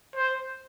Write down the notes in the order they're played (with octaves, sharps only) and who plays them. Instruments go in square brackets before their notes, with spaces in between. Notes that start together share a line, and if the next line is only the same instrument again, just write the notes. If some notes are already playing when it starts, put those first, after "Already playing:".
[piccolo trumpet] C5